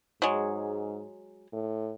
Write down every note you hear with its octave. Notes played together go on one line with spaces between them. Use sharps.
G#2 F#3 G#3
A2